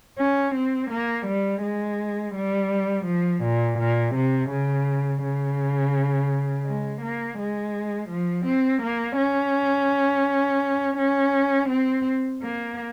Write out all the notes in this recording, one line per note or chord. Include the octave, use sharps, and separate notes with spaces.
C#4
C4
A#3
G3
G#3
G3
F3
A#2
A#2
C3
C#3
C#3
G#3
A#3
G#3
F3
C4
A#3
C#4
C#4
C4
A#3